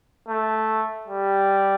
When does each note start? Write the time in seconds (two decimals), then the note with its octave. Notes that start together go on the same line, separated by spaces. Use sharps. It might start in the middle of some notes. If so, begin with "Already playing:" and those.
0.29 A3
1.08 G3